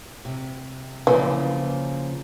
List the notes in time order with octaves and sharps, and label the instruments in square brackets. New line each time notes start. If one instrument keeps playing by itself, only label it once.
[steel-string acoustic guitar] C3
[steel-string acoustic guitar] C#3 F3 A#3 [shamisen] E3